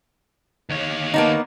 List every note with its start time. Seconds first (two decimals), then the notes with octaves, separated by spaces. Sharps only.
0.70 D#2 C#5
1.14 A#3 B3 D#4